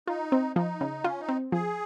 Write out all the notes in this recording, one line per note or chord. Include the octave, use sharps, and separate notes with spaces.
D#4 F4
C4
F3 D#4
C#3
C#4 F4
D#4
C4
F3 G#4